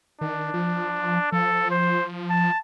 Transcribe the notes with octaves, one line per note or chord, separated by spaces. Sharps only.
D#3 D4
F3
F3 A4
C5
A5